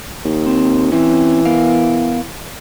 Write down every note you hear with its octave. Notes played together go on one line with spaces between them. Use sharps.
D#2
C4
E3 C4 C#4
B3 A#4 F5